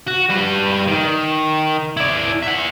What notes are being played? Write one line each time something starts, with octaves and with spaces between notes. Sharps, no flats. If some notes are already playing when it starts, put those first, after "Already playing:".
F#4
G3 B4
D#3
E4 D5
E5 F#5